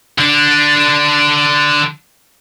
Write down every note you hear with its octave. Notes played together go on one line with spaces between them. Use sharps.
D3 D4